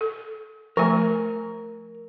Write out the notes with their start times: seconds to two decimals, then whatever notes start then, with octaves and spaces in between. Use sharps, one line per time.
0.01 A4
0.77 F3 A3 A#4 G#5